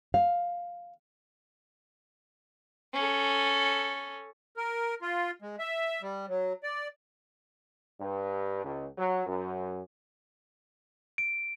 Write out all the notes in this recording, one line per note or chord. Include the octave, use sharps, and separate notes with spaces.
F5
C#4 A4
A#4
F4
G#3
E5
G3
F#3
D5
G2
C#2
F#3
F#2
D7